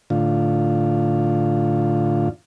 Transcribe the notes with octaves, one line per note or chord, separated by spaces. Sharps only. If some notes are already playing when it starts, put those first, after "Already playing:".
A2 D3 F4